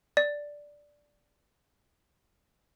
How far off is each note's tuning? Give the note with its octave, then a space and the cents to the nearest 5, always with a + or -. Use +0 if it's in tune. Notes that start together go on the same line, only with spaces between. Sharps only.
D5 -5